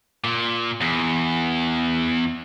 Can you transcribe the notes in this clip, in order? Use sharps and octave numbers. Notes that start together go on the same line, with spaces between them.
A#2
E2